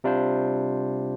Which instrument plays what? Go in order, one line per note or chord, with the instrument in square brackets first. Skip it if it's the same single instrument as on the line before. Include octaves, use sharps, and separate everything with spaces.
[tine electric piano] C3 G3 D4 F4 C5